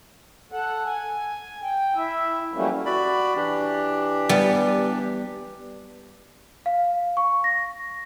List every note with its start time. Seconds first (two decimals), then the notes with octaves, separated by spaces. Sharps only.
0.52 A4 F#5
0.86 G#5
1.63 G5
1.95 E4 E5
2.54 E3 F#3 G3 A3 A#3 C#4
2.86 F#4 D5 B5
3.36 E3 D4 G4
4.29 G3 B3
6.66 F5
7.17 C#6
7.44 A#6